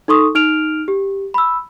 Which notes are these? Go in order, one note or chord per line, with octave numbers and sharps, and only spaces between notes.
D#4 A4 C6 C#6 D#6
D#4 F6 D7 F7
G4
B5 E6